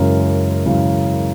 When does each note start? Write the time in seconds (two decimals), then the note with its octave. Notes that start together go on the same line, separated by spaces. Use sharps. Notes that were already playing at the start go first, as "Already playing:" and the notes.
Already playing: F#2 C#3 E3 G#3 C#4 A#4
0.66 F#2 C#3 E3 G#3 C#4